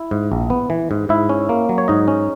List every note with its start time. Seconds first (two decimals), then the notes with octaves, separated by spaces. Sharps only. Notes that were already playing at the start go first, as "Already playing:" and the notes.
Already playing: E4
0.11 G#2
0.32 A#1
0.50 B3
0.70 E3
0.91 G#2
1.09 G#2 E4 E5
1.29 C#4
1.49 A#3
1.69 F#3
1.78 C#5
1.88 G#2 D#4 D#5
2.08 C#4